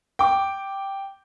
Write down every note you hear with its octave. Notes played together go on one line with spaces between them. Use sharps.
G5 D6